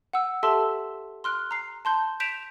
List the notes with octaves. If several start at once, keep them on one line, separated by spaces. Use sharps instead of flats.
F#5 E6
G4 A4 E5 A5 C6 E6
C6 F6 F#6
A#5 C7
A5 C6 G6
G6 B6 D7 E7 F7